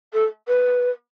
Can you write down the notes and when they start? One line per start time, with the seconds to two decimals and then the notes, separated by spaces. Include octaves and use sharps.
0.13 A4
0.47 B4